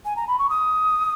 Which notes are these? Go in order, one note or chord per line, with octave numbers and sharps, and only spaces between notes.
G#5
A#5
B5
C#6
D#6